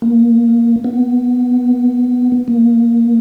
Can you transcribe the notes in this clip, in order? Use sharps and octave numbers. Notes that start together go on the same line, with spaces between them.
A#3
B3
A#3